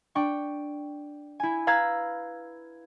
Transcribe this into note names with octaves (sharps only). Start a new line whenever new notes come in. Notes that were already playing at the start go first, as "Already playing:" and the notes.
D4 G5 C#6
E4 G#5
B4 F5 A#5 E6 G#6 A6